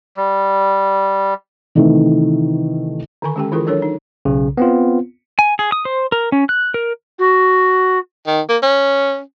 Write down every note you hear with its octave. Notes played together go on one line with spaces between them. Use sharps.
G3
C3 D#3 E3 A3
D3 D#3 G#5 C#6
G#3 C#4 G4 A4 G5
D#3 E3 E4 F4 G#4 A#4
F#3 D4 A4 A#4 C#5
D#4
B1 C#3
B3 C4 F4
G#5
G#4
D#6
C5
A#4
C#4
F#6
A#4
F#4
D#3
A#3
C#4